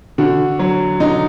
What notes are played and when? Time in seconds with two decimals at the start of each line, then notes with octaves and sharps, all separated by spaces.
0.18 D3 F#4
0.59 F#3
1.00 D3 D#4